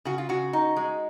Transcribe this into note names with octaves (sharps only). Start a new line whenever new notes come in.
C#3 F#4
F4
C#3 F#4
D#4
G#3